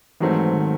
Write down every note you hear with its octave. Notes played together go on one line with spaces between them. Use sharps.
G#2 D#3 E3 F#3 A3 C4
D#3